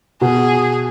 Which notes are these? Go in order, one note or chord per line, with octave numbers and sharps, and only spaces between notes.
B2 G#4